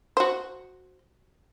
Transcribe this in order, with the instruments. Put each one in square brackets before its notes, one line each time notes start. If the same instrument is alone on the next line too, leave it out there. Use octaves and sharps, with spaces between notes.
[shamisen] F#4 C5